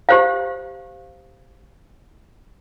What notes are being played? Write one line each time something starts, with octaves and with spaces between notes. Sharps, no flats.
G4 C5 F5